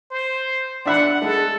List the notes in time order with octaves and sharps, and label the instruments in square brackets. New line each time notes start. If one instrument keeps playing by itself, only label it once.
[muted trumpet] C5
[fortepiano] D4 E5 B5 [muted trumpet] F#5
[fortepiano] G#3 [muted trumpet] A4